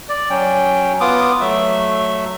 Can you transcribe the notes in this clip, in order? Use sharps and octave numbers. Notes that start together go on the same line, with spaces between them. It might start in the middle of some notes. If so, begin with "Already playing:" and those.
D5
F#3 C#4 G5
B3 F4 D6 D#6
F#3 A3 E5